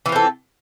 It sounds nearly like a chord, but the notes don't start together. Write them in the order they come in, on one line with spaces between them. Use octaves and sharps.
E3 F4 C4 A4